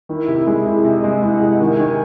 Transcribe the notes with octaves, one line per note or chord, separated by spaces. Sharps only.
D#3 E4
C3
G#3 G#4
C3
C3 D#5
G#3
G#3 F#5
C3
D#3 G#5
D#3 G#5